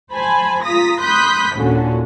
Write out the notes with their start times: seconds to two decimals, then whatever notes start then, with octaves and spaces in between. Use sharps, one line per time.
0.12 C5 G#5 A5 B5
0.64 F4 A#5 D#6 A#6 B6
1.01 B5 C6 D#6 F#6 G6 B6
1.56 D#2 A#2 D3 C#4 F#4